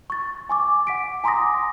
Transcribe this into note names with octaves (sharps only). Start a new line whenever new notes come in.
C#6 A6
G#5 C#6 D6
F#5 B6 D7
G#5 A#5 C6 D6 D#6 A#6